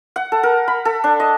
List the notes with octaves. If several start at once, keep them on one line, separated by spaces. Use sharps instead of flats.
F#5
A4
A#4
B5
A4
D4
D#5